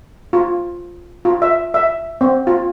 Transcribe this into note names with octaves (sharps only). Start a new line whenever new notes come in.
F4
F4
E5
E5
C4
F4